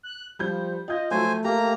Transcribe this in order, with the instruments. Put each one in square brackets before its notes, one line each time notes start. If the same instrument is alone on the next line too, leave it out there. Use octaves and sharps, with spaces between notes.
[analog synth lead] F#6
[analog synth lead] F3 [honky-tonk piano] G3 G6
[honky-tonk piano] F4 G6 [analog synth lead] D#5
[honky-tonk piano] F3 F#3 [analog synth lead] A3 [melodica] C5 G#5
[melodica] A#3 A#5 [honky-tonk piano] G4